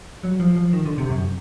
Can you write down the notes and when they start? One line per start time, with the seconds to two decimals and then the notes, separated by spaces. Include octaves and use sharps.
0.23 F#3
0.40 F3
0.56 F3
0.73 D#3
0.86 D3
0.98 C3
1.10 F#2